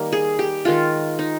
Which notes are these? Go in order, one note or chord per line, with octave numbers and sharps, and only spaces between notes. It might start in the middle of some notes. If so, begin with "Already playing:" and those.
Already playing: D#3 G3 A#3
G#4
G4
D#3 G#3 F4
D#4